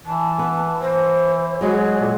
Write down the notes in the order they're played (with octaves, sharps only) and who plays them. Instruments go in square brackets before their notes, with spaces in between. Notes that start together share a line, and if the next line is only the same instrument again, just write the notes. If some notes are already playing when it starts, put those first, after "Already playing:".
[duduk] E3 [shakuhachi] A5
[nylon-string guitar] B3 B4
[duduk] E3 [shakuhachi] C5
[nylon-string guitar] F#3 G#3 F#4 [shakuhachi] G#4
[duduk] A#2